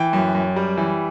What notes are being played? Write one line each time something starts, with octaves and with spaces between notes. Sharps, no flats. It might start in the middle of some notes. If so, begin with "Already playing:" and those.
Already playing: E3 G5
F#2
F#2
G3
E3